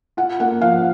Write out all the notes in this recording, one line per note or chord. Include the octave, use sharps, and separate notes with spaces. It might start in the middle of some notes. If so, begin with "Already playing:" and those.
F4 F#5
A#3 F#5
F3 F5